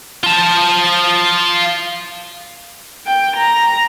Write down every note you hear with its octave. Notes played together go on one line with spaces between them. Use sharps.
F4 A5
G5
A#5